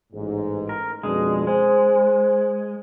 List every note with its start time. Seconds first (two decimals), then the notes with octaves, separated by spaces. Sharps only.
0.13 A1 G#2
0.69 A#4
1.03 F2 B2 G#3 D4
1.47 G#3 C5